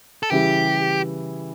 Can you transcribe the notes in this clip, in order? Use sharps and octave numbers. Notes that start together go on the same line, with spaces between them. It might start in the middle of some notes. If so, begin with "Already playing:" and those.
A4
C#3 E3 G3 G4